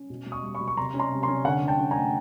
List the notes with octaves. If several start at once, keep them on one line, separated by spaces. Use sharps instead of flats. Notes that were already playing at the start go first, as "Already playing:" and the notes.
Already playing: C#4
B2
B2
C#6 D#6
G3
B5 C#6
B2
C#6
C3 A#5 C6
C#4
A#5 C6
C3
A#5 C6
C#4
D3 F#5 G#5
D3
G5 A5
C#4
G#5 A#5
A3